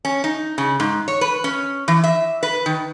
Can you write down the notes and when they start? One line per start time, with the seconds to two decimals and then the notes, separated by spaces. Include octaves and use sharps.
0.05 C#4
0.24 D#4
0.58 C#3
0.80 G#2
1.08 C#5
1.21 B4
1.44 C#4
1.88 E3
2.04 E5
2.43 B4
2.66 D#3